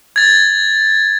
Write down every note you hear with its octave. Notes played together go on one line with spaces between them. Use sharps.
G#6 A6